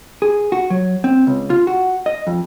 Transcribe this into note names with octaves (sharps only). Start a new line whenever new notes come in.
G#4
F#4
F#3
C4
C#2
F4
F#4
D#5
F2